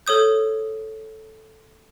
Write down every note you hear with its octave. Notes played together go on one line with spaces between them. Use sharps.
A4 C#5 D#6 G6